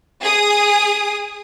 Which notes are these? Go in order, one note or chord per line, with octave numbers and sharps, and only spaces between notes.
G#4 D#6